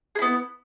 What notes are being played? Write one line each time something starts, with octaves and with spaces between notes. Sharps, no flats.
B3 E4 G#4